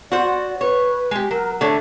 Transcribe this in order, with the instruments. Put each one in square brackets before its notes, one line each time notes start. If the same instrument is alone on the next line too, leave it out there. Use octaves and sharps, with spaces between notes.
[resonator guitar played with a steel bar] F#4 C5 [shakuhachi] D5
[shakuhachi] B4 [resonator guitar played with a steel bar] C#5
[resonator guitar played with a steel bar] G#3 G4
[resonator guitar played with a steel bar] F#3 [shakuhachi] A#4
[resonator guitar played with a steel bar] D3 A3 C#5 [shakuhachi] A5